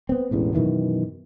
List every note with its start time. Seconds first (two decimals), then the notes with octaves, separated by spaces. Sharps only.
0.09 B3 C4
0.31 E1 A1 E2
0.54 F#2 B2 D#3 E3